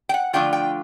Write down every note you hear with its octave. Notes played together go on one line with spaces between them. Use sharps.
G5
F#5
D3 F3 A3 D4 F4 G5
G5